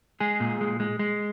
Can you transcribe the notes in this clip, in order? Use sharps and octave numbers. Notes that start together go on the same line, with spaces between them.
G#3 G#4
A#2
G#3
G#3
G#3